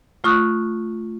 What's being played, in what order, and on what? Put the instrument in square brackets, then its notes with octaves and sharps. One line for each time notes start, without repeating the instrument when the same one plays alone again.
[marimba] A3 F4 C#6 D#6 F#6